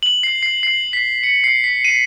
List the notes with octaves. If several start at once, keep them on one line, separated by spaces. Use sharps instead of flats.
F#7
C7
C7
C7
B6
C#7
C7
B6
D#7